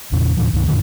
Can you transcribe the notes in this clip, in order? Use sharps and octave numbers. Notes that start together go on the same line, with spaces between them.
E2 A#2 C#3
D#2 A2 D#3 F3
C#2 G2 D#3
F2 A2 D3 D#3